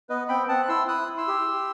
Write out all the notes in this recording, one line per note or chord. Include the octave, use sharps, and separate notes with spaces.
B3 B4 D#5
C4 G5 B5
C4 F#5 A5
F#6
E4 C6 E6
E4 D#6 F#6
E4
C6 E6
G4
G4